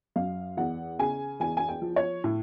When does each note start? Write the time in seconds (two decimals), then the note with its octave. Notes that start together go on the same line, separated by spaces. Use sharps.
0.16 F#2 F5
0.57 E2 F#5
0.99 C#3 G#5
1.40 E2 G#5
1.57 G#5
1.68 G5
1.82 F3
1.96 C#5
2.24 A2